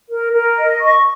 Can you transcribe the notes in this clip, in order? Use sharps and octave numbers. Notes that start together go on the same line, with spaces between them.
A#4
A#4
D#5
C#6